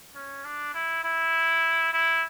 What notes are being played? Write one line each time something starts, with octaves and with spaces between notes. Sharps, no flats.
C#4
D4
E4
E4
E4